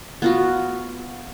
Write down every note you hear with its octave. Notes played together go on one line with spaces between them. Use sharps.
B3 F4 F#4